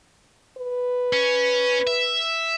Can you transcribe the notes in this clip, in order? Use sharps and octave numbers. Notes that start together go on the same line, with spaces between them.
B4
C#4
E5